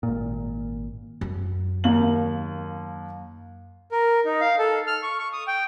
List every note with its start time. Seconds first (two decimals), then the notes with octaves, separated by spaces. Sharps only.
0.03 G#1 A#2
1.21 F#2
1.84 D#2 A#3 F#7
3.92 A#4
4.25 D#4
4.41 F5
4.59 A4
4.87 F6
5.03 C#6
5.19 C#6
5.33 D#6
5.47 G5